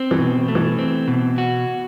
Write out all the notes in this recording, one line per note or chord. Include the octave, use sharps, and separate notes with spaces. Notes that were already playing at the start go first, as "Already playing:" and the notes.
Already playing: C4
E3
B2
A3
E3
C4
B2
F#4